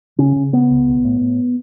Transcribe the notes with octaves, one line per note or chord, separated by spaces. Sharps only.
C#3 C#4
C#3
C#3 B3
C#2
B1
A2
A2